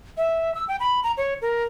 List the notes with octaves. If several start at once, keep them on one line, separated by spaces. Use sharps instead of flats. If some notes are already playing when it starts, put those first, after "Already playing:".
E5
E6
G5
B5
A#5
C#5
A#4